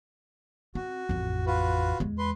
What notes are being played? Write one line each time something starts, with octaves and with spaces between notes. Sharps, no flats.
C4 F#4
A1 F2
F4 F#4 B4
E2 G#3
B4 C6